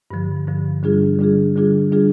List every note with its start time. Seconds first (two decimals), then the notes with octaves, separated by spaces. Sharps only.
0.11 G2 D3 F3
0.47 G2 D3 F3
0.83 D3 G3 D4 F4 G#4
1.19 D3 G3 D4 F4 G#4
1.56 D3 G3 D4 F4 G#4
1.91 D3 G3 D4 F4 G#4